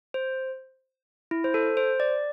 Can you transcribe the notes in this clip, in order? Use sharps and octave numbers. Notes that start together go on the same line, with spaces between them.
C5
E4
C5
A4
C5
D5